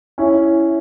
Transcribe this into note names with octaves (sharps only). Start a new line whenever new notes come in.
C#4 E4